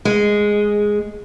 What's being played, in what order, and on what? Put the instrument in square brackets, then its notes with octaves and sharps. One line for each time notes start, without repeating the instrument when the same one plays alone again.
[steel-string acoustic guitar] G#3